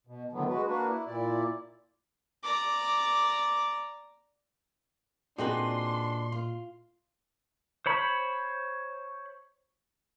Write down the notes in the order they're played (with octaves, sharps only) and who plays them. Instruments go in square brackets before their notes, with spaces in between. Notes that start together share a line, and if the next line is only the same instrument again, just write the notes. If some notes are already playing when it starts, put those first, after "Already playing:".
[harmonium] B2
A2 D3 D#3 F#3 B3
G#3 F#4 B4
A#3 D4 F#4 B4
E4
A#2 E4 D5
[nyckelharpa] D5 A#5 [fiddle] D6
[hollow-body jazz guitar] A#2 D#4 F#4 [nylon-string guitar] C4 G#4 B4 [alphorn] D4 [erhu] C6
[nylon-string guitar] F4
[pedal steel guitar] C5 C#5 B5